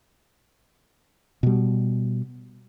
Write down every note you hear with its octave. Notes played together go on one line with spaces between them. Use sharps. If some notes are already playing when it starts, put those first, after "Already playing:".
B2 G3